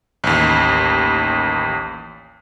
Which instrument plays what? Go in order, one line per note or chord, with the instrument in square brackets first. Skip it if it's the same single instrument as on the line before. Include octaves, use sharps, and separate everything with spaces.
[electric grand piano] A1 D#2